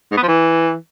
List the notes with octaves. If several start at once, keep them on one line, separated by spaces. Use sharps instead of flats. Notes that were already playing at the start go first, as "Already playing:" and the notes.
G#2
B3
F3
E3